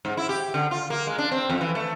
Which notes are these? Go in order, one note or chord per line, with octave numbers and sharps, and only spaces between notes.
G#2
E4
G4
D3
F4
A#3
G#3
D4
C4
F2
E3
A3